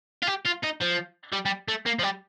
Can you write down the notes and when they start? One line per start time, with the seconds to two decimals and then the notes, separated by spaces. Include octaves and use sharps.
0.22 F4
0.27 G4
0.45 F4
0.63 D#4
0.81 F3
1.32 G3
1.45 G3
1.68 A3
1.86 A#3
1.99 F3
2.03 G3